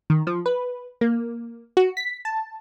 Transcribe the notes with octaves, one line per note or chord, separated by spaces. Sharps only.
D#3
F3
B4
A#3
F#4
B6
A5